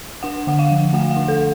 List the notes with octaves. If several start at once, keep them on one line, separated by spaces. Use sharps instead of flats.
D4 F#5
D3 F#5
F5
F3
A3 F#5
F#5
D4
A4